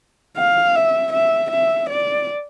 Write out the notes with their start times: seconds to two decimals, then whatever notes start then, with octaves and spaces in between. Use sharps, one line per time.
0.37 F5
0.75 E5
1.12 E5
1.50 E5
1.89 D5